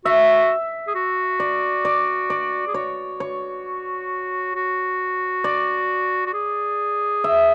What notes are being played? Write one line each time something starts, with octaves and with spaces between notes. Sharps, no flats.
F#4 E5
G#4
F#4
D5
D5
D5
G#4
F#4 C#5
C#5
F#4
D5
F#4
G#4
E5